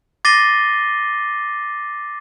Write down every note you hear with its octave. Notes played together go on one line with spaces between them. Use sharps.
D6 A6 A#6 C7 D#7 G7